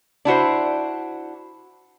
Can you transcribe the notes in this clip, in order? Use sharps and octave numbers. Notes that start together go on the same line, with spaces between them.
D4 E4 F#4 C5